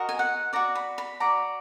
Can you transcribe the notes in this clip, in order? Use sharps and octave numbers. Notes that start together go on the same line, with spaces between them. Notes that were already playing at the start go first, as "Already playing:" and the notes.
Already playing: F#4 A#4 D#5
G#5
F#5
F#4 D5 A#5
B5
B5
F#4 D5 A#5